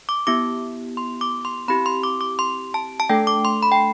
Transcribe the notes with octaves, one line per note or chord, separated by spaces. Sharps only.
D6
B3 E4 G4 D6
C6
D6
C6
C4 E4 G4 B5
C6
D6
D6
C6
A5
A5
A3 D4 A4 G5
D6
C6
B5
G5